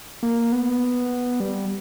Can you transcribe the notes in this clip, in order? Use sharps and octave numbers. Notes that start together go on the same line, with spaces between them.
A#3
B3
G3